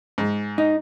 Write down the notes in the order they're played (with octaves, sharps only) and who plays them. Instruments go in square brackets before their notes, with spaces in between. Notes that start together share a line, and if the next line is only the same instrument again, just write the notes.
[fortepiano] G#2
[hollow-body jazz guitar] D#4